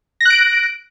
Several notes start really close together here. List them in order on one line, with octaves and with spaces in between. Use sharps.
A#6 F#6 D7